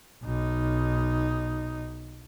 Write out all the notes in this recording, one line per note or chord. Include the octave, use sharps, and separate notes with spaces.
B1 D#4